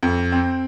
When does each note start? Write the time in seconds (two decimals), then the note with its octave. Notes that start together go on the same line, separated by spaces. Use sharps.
0.03 F2
0.32 C4